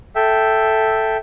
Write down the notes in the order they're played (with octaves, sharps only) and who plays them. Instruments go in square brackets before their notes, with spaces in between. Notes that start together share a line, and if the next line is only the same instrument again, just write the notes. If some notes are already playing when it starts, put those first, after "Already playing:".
[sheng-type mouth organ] A4 E5 G5